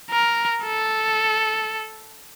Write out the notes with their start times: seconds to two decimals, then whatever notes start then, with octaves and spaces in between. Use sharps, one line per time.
0.10 A#4
0.64 A4